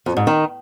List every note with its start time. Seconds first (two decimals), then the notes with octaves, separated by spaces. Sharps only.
0.06 F2
0.17 G#2
0.27 D#3